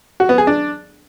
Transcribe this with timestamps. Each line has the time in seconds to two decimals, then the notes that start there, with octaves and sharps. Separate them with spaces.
0.20 F#4
0.29 B3
0.38 G#4
0.47 D4